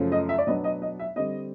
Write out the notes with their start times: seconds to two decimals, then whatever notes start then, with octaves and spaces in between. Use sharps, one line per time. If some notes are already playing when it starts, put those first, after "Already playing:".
Already playing: F#2 C#3 F3 A3 C#4
0.12 D#5
0.29 E5
0.38 D5
0.47 B2 F#3 B3 D4 D#5
0.64 D#5
0.82 D#5
0.99 E5
1.16 D3 G3 C4 D#5